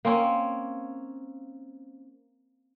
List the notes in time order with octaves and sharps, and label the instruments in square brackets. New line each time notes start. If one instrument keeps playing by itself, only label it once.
[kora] A#3 C4 C#4